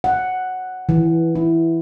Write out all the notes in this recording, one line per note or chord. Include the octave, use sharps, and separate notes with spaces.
F#5
E3
E4